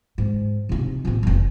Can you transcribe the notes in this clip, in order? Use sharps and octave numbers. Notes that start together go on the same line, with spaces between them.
G#2
C3 D#4
A1 B3
F1 C#4